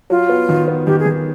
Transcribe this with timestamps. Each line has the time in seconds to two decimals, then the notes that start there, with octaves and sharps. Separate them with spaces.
0.10 F#3 F4
0.29 B3
0.49 D#3
0.68 B3
0.87 D#3 G4
1.00 G#4
1.06 D#3